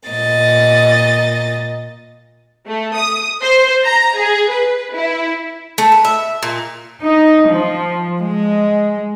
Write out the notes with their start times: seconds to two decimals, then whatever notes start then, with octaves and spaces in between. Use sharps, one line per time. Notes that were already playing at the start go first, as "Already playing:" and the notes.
0.10 A#2 D#5 A6
2.67 A3
2.96 D#6
3.42 C5
3.85 A#5
4.17 G#4
4.50 B4
4.94 E4
5.78 A3
5.92 B4
6.05 E5
6.43 A#2
7.02 D#4
7.49 F3
8.21 G#3